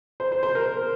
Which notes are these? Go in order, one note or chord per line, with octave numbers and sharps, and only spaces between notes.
C5
C5
C5
A#4